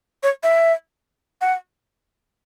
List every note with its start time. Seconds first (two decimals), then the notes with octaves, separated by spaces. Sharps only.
0.23 C#5
0.43 E5
1.41 F#5